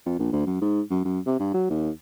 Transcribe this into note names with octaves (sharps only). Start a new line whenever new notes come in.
F2
A#1
D2
F#2
G#2
F#2
F#2
C3
G2
F#3
D#2